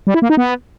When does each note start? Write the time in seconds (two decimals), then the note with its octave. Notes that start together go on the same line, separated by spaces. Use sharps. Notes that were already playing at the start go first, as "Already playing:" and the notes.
0.07 G3
0.14 E4
0.22 A#3
0.30 D#4
0.37 B3